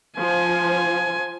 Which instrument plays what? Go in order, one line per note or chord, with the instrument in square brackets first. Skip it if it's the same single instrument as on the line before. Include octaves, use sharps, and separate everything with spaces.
[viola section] F3 C5 [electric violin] G#5